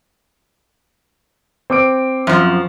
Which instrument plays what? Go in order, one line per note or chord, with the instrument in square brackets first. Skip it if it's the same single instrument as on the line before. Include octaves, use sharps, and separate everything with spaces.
[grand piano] C4 D6 D7
[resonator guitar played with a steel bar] F#2 F3